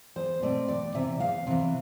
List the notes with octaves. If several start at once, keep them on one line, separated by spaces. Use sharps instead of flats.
E2 C5
B2 A3 C4 D5
E2 D5
C3 E3 E5
E2 F5
C3 E3